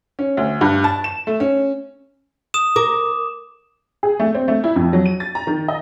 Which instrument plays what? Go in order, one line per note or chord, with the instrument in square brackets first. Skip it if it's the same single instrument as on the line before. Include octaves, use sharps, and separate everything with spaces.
[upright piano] C#4
D2
G2
A5
E7
A3
C#4
[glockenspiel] D#6 E7
[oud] A#4 [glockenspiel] D6
[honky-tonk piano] G#4
A3
C4
A3
E4
F2
F#3
D#7
A6
A#5
D#3
D#5